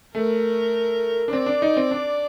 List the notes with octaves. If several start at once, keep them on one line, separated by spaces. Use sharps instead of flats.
A3 A#4
D4
C4 D5
D4
D#4
C4
D4